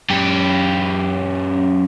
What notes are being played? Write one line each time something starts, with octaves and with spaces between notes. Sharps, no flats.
F#2 G4